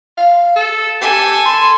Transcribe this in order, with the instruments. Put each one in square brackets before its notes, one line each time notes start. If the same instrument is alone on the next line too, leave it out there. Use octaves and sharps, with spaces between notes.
[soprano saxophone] F5
A4
[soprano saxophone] G4 [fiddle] A4 G#5
[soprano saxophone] C6